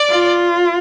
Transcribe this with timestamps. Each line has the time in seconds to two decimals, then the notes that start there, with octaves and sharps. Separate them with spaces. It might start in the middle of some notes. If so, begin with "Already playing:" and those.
Already playing: D5
0.10 F4